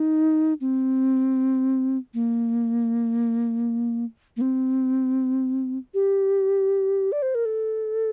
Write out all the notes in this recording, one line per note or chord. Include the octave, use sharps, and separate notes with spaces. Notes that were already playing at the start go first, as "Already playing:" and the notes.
Already playing: D#4
C4
A#3
A#3
C4
G4
D5
C5
A#4
A4